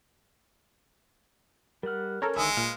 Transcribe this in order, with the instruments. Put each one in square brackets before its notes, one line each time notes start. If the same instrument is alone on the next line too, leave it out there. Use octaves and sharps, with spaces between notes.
[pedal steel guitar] G3 F#5 [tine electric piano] A#4 F6
[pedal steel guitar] C#4 [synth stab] A4 A#4 C#5
[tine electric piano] G1 G#5 D#6 [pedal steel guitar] D3 D#3 E5 [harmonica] G#3
[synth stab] A#2 [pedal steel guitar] B4 F5